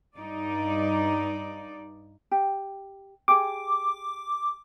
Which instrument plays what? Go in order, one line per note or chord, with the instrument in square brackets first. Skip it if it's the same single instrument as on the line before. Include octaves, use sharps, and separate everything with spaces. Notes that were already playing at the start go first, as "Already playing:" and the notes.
[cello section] G2 D#4 D5
[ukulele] G4
[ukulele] G4 G#4 [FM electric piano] D6